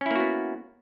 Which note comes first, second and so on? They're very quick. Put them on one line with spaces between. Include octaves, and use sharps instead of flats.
C#4 E4 A#3 F#4 B3